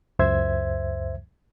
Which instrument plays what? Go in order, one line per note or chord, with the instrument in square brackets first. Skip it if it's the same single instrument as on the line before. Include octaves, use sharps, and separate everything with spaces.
[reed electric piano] C#2 F#2 C5 E5 G#6